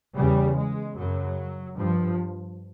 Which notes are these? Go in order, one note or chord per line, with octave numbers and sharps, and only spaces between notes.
E2 C#3 G3
G#3
F#2 C#3 F#3
G2 F3